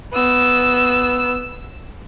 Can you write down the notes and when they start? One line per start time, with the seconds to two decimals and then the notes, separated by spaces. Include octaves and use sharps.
0.13 B3 E6